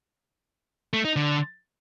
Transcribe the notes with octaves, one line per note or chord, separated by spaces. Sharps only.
A3
D#4
D3